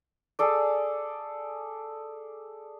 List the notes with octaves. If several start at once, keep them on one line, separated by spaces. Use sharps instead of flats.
G#4 A4 D5